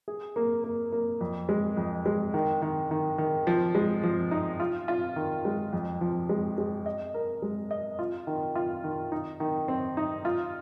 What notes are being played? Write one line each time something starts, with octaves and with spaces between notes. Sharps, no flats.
G#4
A#3
A#3
A#3
F2
G#3
F2
G#3
D#3
D#3
D#3
D#3
F3
G#3
F3
D#4
F4
F4
D#3
G#3
F2
F3
G#3
G#3
D#5
A#4
G#3
D#5
F4
D#3
F4
D#3
D#4
D#3
C4
D#4
F4